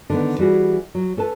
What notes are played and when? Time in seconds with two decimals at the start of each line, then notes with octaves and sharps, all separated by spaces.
0.10 D3 D#3 B3
0.38 E3 G3 F#4 G#4
0.95 F#3
1.17 C#4 A4 B4 A5